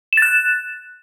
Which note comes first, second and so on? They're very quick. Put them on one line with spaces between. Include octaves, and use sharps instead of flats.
E7 A6 F#6